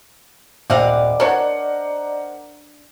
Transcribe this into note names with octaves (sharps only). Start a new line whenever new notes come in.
D#1 C4 D5 D#5 F5 F#5 D6
D4 A#4 C5 C#5 F#5